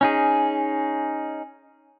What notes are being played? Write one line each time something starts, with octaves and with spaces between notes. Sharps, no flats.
C#4 D#4 G#4